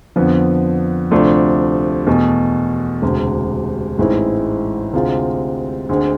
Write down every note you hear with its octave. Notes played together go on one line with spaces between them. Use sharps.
F2 D3 F3 B3
D2 C3 F3 A3 D4
E2 B2 A3
E1 D2 C3
A1 G#2 G#3 C4 E4
D2 C3 G#3 C4 F4
D2 D3 G#3 C4